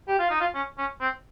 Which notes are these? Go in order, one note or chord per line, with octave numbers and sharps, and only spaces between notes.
G4
F4
D#4
F4
C#4
C#4
C4